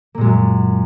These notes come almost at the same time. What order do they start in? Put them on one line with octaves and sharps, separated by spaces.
A#3 A#2 G#3 F#2